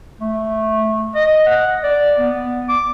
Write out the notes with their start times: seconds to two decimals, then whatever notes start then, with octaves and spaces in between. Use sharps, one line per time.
0.21 A3
1.15 D#5
1.46 F#5
1.83 D5
2.18 B3
2.69 D6